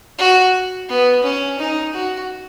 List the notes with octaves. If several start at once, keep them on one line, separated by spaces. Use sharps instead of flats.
F#4
B3
C#4
D#4
F#4